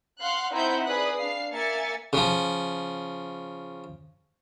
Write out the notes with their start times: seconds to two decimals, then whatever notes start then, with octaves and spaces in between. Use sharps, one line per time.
0.20 F5 F#5 C6 F#6
0.52 C4 D#4 E4 F#5 B5 G6
0.85 G#4 B4 D5 B5 D#6 F#6
1.18 D4 F5 C7
1.53 A#3 E5 G#5 A6 C#7
2.13 C#3 F3